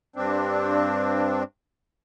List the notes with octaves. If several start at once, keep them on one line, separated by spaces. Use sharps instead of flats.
G2 C4 D4